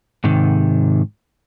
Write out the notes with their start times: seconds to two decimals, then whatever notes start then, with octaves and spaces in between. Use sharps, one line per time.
0.24 G#2 C3 D#3